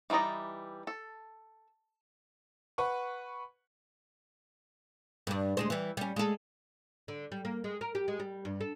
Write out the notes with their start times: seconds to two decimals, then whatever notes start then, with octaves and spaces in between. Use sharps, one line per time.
0.10 E3 G3 D#4 D5 D#5
0.87 A4
2.78 B4 F#5 C#6
5.27 G2 D4
5.57 D2 G#3 C5
5.70 E3 G3
5.97 G3 C#4
6.16 G#3 A4
7.08 D3
7.32 G3
7.45 A#3
7.64 G#3
7.81 A#4
7.95 G4
8.08 G#3
8.20 G3
8.45 G2
8.61 A4